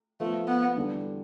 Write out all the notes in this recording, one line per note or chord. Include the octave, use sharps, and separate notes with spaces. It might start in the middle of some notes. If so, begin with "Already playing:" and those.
F3 A3 B3 F4 A4 C5
B3
E2 D3 G3 D4 A4